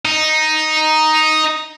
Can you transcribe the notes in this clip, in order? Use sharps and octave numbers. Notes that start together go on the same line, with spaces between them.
D#4